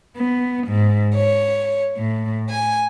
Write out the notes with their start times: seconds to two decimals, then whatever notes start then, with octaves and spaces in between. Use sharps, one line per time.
0.16 B3
0.68 G#2
1.14 C#5
1.98 A2
2.50 G#5